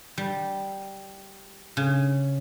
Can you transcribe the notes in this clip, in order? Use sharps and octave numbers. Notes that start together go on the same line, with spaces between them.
G3
C#3